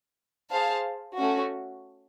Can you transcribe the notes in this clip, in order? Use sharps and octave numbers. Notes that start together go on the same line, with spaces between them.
G#4 C5 F5 A5
A3 C#4 F#4